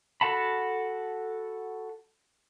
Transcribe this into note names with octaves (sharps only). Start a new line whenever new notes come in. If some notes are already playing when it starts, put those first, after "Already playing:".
F#4 A4 F#5 A5 B5